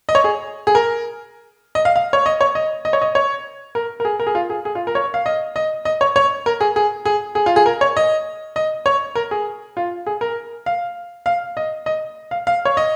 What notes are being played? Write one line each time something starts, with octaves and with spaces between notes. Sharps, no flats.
D#5
C#5
G#4
G#4
A#4
D#5
F5
F5
C#5
D#5
C#5
D#5
D#5
C#5
D#5
C#5
A#4
A#4
G#4
A#4
G#4
F4
G#4
G#4
F4
A#4
C#5
F5
D#5
D#5
D#5
C#5
C#5
A#4
G#4
G#4
G#4
G#4
F4
G#4
A#4
C#5
D#5
D#5
C#5
A#4
G#4
F4
G#4
A#4
F5
F5
D#5
D#5
F5
F5
C#5
D#5